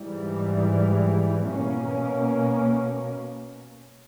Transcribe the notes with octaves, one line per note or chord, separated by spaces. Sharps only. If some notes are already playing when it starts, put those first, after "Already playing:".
Already playing: G#2 E3 G3
B2 A#3 C#4